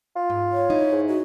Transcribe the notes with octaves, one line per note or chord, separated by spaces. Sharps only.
F4
G#2
C#5
D#4 E4
G#2
F#4